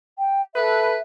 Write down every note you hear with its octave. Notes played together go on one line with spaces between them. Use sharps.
G5
A4 B4 E5